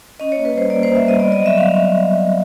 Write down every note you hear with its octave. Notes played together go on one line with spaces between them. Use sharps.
C#4 D#5
A#3 C#5
B4
G3 C5
A#3 D5
A#3 C5
E5
G3 D#5
D#5
B3 D5
F#3 D#5
E5
F#3 F5